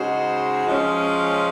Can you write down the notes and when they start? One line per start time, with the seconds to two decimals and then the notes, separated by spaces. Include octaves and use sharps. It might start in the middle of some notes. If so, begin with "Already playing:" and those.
Already playing: C#3 G#3 D#4 F#4 C5
0.68 F3 G#3 C#4